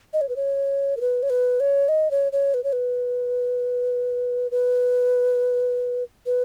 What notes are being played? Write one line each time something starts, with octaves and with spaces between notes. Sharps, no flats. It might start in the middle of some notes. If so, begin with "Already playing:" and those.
D#5
C#5
B4
C#5
A#4
B4
C#5
B4
C#5
D#5
C#5
C#5
B4
C#5
B4
B4
B4